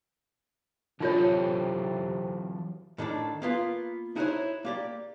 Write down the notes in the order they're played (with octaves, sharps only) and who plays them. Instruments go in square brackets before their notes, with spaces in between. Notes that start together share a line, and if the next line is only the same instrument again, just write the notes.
[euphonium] C3 [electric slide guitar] E3 F#3 A4 [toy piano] D#4 F4 C#5
[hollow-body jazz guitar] A2 D#3 D4 A4
A#3 B3 F4
D#4 E4 F#4 A#4 C5 C#5
A#3 G4 D5